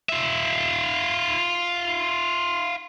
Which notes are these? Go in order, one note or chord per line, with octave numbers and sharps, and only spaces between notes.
F4 E5